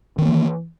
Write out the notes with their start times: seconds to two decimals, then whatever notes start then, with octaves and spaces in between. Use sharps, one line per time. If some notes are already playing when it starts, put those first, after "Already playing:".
0.18 D#3
0.22 C4
0.25 A#3
0.29 E3